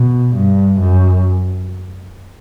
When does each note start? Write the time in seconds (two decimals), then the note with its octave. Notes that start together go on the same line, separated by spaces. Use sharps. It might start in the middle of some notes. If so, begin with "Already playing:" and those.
Already playing: B2
0.35 G2
0.81 F#2